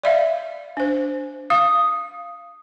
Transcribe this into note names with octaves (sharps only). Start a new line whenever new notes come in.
D5 E5 F5
D4 C5
F5 D#6